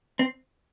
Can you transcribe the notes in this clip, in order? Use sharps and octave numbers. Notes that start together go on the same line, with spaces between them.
C4